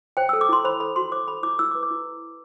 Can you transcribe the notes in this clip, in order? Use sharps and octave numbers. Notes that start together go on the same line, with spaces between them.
C5 G5
A4 E6
D6
E4 C6
C5 B5
A4 B5
F#4 C6
C5 D6
A4 B5
E4 D6
E4 E6
D6
B4
D6
E4